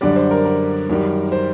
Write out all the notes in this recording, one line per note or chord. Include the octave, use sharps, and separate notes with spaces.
F#2 D3 G3 D5
C5
A#4
A#4
F#2 D#3 G3
C5